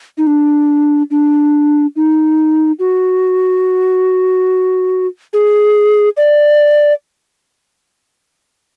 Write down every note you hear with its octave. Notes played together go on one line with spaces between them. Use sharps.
D#4
D4
D4
D#4
F#4
G#4
D5